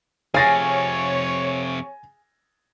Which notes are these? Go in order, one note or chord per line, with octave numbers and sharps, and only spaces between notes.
F2 C3 G#4 C#5 F5 G#5 A6 A#6